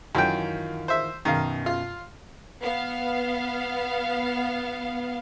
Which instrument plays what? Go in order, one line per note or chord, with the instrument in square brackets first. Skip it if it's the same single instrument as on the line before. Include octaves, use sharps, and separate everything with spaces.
[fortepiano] F#2 G5 [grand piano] D#3 E3 F4
[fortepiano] C5 E5
[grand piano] F#2 B2 [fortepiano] D#3 F5
[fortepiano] F4
[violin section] B3 F5